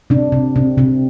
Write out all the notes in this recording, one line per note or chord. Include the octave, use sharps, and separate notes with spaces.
C3 D4
C3
C3
C3